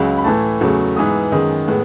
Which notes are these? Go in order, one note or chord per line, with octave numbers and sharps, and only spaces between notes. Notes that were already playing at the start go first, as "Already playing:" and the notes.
Already playing: C#2 C#3 F#3
B5
A2 E3 A3 A5
E2 C#3 F#3 A3
G#2 E3 G#3 B3 D#6
F#2 D#3 G#3 B3 D#6
A2 G#3 B3